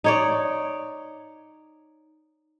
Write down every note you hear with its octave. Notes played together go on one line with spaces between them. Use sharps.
D#4 C#5 D5